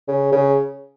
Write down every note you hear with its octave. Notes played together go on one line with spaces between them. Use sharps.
C#3
C#3